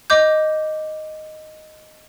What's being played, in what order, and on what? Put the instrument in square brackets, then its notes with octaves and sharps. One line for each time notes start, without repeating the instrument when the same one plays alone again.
[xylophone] D#5 D6 G6